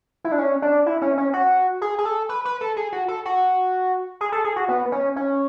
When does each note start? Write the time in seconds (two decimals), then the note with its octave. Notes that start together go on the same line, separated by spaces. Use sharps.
0.25 E4
0.32 D4
0.38 C#4
0.62 D4
0.86 E4
1.02 C#4
1.18 C#4
1.33 F#4
1.81 G#4
1.98 G#4
2.05 A4
2.29 B4
2.45 B4
2.61 A4
2.76 G#4
2.92 F#4
3.08 A4
3.25 F#4
4.21 G#4
4.32 A4
4.44 G#4
4.56 F#4
4.69 B3
4.92 C#4
5.16 C#4